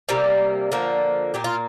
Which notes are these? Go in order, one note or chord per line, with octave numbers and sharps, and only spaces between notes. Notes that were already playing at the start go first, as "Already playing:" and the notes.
C3 G3 A#3
D3 F3 A#3
A#2 A#3 G4
F4